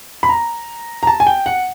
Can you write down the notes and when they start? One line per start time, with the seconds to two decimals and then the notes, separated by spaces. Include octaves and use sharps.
0.23 B5
0.29 A#5
1.03 A#5
1.07 A5
1.20 G#5
1.27 G5
1.46 F#5